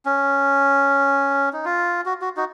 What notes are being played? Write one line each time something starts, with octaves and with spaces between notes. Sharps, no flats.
C#4
D#4
F4
F#4
F#4
D#4 F#4